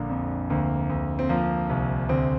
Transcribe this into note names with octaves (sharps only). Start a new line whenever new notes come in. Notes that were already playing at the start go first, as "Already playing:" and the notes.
Already playing: A#1 D3 A#3
F2
D2 A#3
D2
C4
F3 A#3
C2
D2 C4